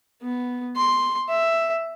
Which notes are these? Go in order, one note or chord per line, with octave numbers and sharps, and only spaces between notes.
B3
C6
E5